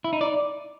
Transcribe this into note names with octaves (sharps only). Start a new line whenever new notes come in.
E4
D#4
D5